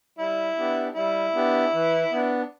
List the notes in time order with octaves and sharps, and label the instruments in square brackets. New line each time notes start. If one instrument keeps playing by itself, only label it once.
[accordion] G3 [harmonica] E4
[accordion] B3 D4 G4
[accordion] G3 [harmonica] E4
[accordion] B3 D4 G4
E3
B3 D4